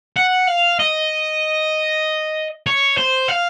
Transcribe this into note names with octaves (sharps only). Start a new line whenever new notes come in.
F#5
F5
D#5
C#5
C5
F5